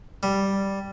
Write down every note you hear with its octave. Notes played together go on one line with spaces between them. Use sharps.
G3